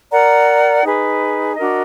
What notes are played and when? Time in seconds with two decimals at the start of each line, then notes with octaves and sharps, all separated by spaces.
0.11 A#4 D5 F#5 A#5
0.84 D#4 G#4 B4
1.57 D4 F#4 A#4 D#5